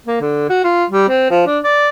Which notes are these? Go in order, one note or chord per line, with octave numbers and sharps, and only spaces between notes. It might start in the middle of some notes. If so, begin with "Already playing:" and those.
A#3
D3
F#4
F4
G3
C4
F3
D4
D5